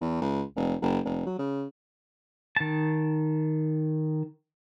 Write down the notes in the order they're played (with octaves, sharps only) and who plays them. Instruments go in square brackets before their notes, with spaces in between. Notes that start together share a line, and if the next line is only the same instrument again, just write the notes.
[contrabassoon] E2
C#2
F1
F#1
F1
F#3
C#3
[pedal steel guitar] D#3 A5